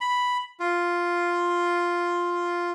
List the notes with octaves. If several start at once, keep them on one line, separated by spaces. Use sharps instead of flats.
B5
F4